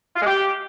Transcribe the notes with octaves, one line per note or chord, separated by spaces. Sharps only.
F4
G#3
G4